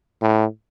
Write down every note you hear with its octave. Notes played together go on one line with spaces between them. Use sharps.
A2